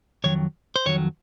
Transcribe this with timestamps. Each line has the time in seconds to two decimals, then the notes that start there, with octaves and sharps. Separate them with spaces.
0.24 F2 D#3 F#3 C#5
0.76 C5
0.86 F2 D#3 F#3 C#5